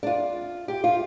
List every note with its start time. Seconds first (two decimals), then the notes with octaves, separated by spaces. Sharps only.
0.03 D4
0.07 F4
0.68 G4
0.84 F4